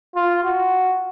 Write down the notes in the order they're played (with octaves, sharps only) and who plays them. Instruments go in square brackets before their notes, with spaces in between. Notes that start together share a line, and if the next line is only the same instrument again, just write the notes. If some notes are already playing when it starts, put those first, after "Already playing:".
[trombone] F4
F#4